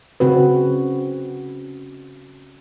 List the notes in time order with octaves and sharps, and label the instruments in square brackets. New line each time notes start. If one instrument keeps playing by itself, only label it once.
[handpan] C#3 C4 F#4 B4